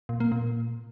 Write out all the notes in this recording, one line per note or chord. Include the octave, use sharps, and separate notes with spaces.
A#2
A#3
A#2